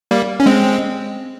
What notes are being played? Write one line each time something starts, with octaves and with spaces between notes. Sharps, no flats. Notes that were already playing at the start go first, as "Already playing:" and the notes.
G3 A#3
C#4
G#3 C4